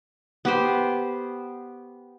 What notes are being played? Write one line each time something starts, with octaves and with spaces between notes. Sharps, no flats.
B3 G4 C5